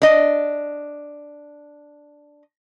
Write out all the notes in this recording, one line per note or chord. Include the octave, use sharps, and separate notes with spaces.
D4 D#5